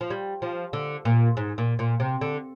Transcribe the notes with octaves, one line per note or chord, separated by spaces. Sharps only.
F3
G3
F3
D3
A#2
G#2
A#2
A#2
C3
D3